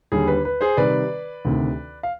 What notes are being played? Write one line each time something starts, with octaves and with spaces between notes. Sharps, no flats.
D#2 D3 G3 G#4
B4
B4
G#4 C5
C3 D#3 G3 B4 D5
D2 C3 D#3
F5